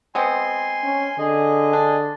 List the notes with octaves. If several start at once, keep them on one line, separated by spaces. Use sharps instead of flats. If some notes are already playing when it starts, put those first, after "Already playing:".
G#3 B3 C4 G#5 C6
C#4
D3 G#4 D#5
D4